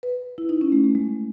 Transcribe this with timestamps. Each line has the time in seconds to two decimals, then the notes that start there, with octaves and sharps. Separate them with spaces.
0.03 B4
0.38 E4
0.49 D#4
0.61 C#4
0.72 A3
0.84 A3
0.95 G#3